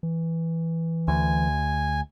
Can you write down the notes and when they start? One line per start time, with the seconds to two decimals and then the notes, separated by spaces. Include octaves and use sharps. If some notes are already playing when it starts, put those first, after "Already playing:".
0.03 E3
1.08 D2 G#5